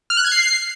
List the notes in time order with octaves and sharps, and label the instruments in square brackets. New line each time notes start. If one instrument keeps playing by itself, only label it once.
[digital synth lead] F6
F#6
G#6
C7